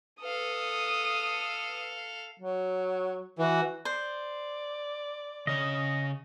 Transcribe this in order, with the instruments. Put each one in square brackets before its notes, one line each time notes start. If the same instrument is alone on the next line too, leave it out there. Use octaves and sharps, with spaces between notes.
[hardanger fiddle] A4 F5 [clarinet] B4 [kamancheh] D#6
[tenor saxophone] F#3
[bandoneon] E3 [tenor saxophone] F#4
[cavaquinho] C5 [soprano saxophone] D5
[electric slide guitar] C#3 C#5 [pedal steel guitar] D#5